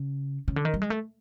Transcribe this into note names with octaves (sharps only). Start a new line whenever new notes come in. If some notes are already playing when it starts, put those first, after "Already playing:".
Already playing: C#3
C#3
D3
D#3
G3
G#3
A3